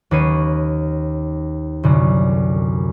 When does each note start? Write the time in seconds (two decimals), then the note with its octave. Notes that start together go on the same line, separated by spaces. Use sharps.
0.11 D#2 C#4 B4 C#5 C7 D#7
1.83 C2 F#2 D3